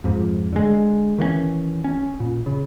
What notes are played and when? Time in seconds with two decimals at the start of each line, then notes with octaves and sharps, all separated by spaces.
0.04 F2 G#2 F3
0.53 D3 G#3
1.18 D#3 E3 A#3 C#4
1.84 C#4
2.20 A#2
2.46 C#3